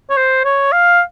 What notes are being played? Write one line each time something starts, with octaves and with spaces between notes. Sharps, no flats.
C#5
C5
C#5
F5